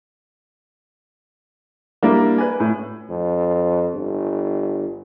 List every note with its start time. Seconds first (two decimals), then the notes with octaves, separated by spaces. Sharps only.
2.02 G3 A#3 D4 E4
2.38 B4 G#5
2.60 A2
3.10 F2
3.94 G1